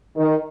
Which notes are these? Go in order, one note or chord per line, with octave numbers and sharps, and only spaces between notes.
D#3